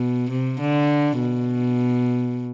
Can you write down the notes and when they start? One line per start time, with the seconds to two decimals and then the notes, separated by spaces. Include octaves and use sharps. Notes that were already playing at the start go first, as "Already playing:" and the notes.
Already playing: B2
0.30 C3
0.60 D3
1.19 B2